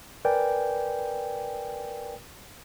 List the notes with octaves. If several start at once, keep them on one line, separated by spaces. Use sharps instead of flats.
A#4 B4 D5 G5 G#5